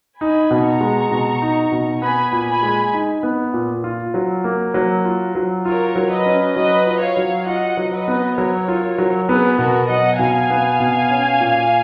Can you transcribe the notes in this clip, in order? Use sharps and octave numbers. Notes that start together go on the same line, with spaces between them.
D#4 G#5 B5
B2
A#5 C#6
G#3
B2
D#4
B2
B3 G#5 B5
A#2
G#5 B5
G#3
D#4
B3
A#2
F4
F#3
A#3
F#3
F4
F#3
F4 A#4 C#5
F#3
B4 D#5
C#4
F#3 B4 D#5
F4
C#5 F5
F#3
F4 D#5 F#5
F#3
B4 D#5
B3
F#3 A#4 C#5
F4
F#3
B3 G#4 B4
B2 F#4 A#4
F#3 D#5 F#5
B2 F5 G#5
B3
B2
C#4
A#2